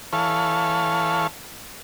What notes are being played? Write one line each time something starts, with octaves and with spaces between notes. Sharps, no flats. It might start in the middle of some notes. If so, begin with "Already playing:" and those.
E3 A4 C#5 F5